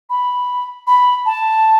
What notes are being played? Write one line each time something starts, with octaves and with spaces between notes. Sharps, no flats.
B5
B5
A5